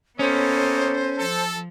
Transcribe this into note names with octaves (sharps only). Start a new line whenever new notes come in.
A#3 B3 C#4 A4 C5 C#5 D#5
F3 A4